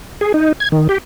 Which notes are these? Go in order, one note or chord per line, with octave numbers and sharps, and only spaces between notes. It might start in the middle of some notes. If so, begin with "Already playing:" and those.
G#4
D#4
G#6
D#3
G4